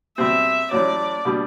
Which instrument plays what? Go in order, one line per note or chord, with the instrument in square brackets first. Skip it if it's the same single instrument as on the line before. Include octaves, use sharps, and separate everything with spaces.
[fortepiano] B2 G3 C4 [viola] E5
[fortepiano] A1 A2 F#3 [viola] D5
[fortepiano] B2 G3 D4